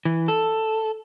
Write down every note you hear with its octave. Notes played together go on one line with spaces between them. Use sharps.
E3
A4